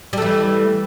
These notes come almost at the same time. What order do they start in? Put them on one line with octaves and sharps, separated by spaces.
G3 A3 E3